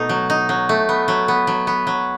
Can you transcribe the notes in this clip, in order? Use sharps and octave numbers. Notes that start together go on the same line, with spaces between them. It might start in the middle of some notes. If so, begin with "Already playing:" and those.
Already playing: B2 A3 D#4
F#3
D#4
F#3
A3
B3
F#3
B3
F#3
B3
F#3